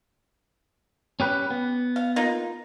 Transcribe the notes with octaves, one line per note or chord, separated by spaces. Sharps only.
C#4 G4 B4
B3
F5
A#3 D#4 F4